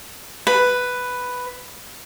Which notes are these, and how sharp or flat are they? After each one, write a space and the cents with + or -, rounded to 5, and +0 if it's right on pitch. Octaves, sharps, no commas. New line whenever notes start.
B4 +5